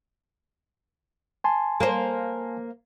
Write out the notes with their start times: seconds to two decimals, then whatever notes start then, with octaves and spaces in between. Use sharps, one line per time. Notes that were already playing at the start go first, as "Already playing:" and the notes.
1.44 G#5 A5 C6
1.80 A#3 C5